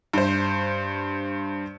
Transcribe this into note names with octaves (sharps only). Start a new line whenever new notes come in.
G2 C5